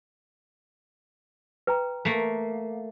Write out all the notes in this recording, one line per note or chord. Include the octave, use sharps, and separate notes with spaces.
B4 G5 A#5
A3 A#3